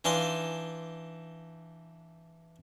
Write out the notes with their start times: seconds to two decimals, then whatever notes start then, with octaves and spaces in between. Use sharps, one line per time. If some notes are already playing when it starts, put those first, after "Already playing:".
0.05 E3 D4 D#4 F5 C6